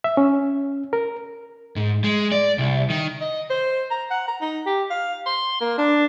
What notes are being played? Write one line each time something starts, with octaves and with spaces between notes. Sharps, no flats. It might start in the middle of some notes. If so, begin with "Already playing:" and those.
E5
C#4
A#4
G#2
G#3
D5
C2
D#3
D#5
C5
A#5
F#5
A#5
D#4
G4
F5
C6
A#3
D4